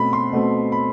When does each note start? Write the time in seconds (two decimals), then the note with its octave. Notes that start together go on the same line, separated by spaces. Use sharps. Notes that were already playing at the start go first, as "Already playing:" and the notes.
Already playing: B2 A3 C4 B5
0.13 C6
0.33 B2 A3 C4
0.72 B5